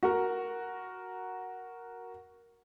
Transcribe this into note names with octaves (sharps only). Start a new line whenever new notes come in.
F#4 A#4